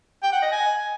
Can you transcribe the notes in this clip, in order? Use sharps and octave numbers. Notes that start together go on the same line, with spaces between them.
G5
F#5
D#5
G#5